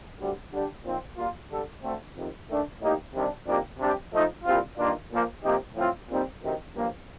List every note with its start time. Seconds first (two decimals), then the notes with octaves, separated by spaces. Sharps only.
0.18 D2 D3 G3
0.51 D3 G3 D4 G4
0.83 A#2 F3 C4 D#4
1.16 A#2 G3 A#3 F4
1.49 D3 G3 D4 A4
1.82 D2 D3 A3 C4
2.15 F2 C3 D#3
2.48 D#3 A3 D4
2.80 A2 G3 A#3 D#4 G4
3.13 C3 D#3 G3 D4
3.46 F2 D#3 A#3 D4 G4
3.79 C3 G3 D4 G4
4.11 F3 A3 D#4
4.44 C2 A#2 G3 C4 F4
4.77 G2 D#3 A#3 D4 F4
5.10 A#2 F3 A#3
5.43 C3 F3 A#3 D#4 G4
5.75 A2 F3 C4 F4
6.08 A#2 G3 C4 D#4
6.41 D2 C3 D#3
6.74 G2 F3 A#3